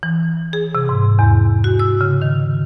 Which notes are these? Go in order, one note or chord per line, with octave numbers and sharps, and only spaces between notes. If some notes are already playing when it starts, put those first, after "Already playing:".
E3
G#4
C3
G#2
E2
F#4
E6
C#3
D#3